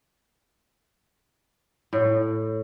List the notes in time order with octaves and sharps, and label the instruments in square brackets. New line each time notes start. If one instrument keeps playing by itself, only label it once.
[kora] A2